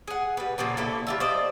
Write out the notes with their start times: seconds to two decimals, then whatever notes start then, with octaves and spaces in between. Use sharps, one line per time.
0.08 G#4 F#5
0.37 G3 B4
0.58 A#2 C#3 F3 A#3
0.77 D3 A#3 E4 A4
1.07 G3 F4 E5
1.20 C5 D5 D#5